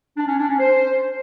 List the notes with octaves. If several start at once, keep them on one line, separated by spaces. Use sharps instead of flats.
D4
C#4
D4
C#4
C5